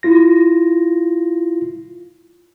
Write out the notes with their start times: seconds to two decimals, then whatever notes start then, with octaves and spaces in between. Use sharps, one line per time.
0.03 E4 F4 A#6